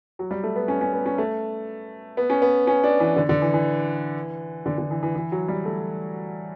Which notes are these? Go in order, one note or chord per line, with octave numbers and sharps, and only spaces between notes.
F#3
G3
A3
B3
C#4
C#4
B3
C#4
A3
B3
C#4
B3
C#4
D4
E3
D3
D3
E3
E3
D3
D3
E3
E3
E3
F#3
G3
A3